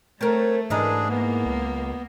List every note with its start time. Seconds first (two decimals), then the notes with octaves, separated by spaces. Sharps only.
0.21 A3 C4 A#4 C#5
0.70 G#2 E3 G#3 D4 G#4 A#4
1.10 A#3 B3
1.46 C#2